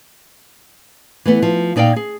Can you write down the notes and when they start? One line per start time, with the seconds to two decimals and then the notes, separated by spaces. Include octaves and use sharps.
1.25 E3 A3 B3
1.42 F3
1.76 A#2 D#4 D5 F5 G5
1.96 G#4